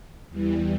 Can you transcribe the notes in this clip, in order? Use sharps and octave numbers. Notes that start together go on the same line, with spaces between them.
E2 E3 G3